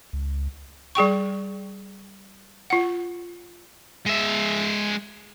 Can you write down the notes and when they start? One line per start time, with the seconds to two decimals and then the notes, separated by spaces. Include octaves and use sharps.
0.13 C#2
0.95 G3 G#4 G5 C#6
2.70 F4 F#5
4.06 G#3 E5